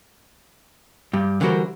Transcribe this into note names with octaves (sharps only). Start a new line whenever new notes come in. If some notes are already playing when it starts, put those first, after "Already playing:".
G2 G3
D3 E3 G3 F#4 A#4 C5